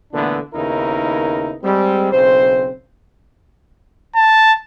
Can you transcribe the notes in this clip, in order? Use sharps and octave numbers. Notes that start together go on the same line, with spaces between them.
A#2 D3 E3 A3 B3 D4
D#2 C#3 B3 D#4 E4 A#4
G3 G#3 C4
B1 C#3 C4 C5
A5